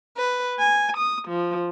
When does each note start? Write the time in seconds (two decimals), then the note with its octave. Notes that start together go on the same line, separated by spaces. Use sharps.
0.18 B4
0.59 G#5
0.97 D#6
1.29 F3